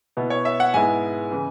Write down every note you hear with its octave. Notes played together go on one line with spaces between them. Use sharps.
B2 B3 E4
C#5
E5
F#5
G#2 G#3 B3 E4 G#5
C#3 E3